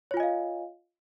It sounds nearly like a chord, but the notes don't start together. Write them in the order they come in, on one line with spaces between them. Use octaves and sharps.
C#5 F4 G#5 D#5 F5